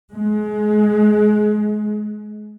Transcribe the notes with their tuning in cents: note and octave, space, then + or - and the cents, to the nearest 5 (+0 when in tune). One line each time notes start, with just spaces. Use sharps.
G#3 +25